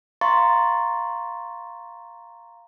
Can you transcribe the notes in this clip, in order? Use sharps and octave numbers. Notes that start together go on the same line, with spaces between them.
F5 A#5 C6 C#6 A6